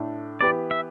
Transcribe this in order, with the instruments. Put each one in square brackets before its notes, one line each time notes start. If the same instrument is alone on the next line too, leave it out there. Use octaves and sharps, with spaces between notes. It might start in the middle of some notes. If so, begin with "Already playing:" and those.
Already playing: [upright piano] A2 A3 D4
[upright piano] E3 B3 G4 B4 [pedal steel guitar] D5
[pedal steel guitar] E5